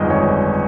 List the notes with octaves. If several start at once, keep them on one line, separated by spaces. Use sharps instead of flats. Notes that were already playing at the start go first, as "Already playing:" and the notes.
Already playing: G1 F2 D#3 G#3 D#5
C#5